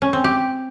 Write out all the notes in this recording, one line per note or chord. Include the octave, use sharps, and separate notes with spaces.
C#4
C4
G4